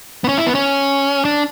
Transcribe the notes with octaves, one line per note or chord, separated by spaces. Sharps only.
B3
C#4
E4
B3
C#4
D4